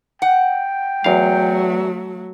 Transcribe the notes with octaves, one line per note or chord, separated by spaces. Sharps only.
F#5 G5
E2 F#3 A3 F5